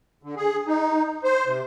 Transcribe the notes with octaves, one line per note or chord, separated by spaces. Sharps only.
D3
G#4
D#4
C5
C3